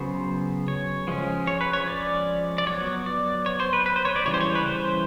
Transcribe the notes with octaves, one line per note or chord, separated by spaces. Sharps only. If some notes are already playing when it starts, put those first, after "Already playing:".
Already playing: C#3 F#3 B3 C5
C#5
F3 G#3 C#4
C#5
B4
C#5
D5
D5
F#3 B3 C#5
D5
C#5
C5
B4
B4
C5
C#5
D5
C#3 E3 G3 C#5
C5
C#5
B4
C5